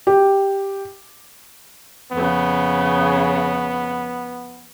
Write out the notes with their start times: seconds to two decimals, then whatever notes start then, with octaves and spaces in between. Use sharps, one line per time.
0.07 G4
2.12 F2 C#3 B3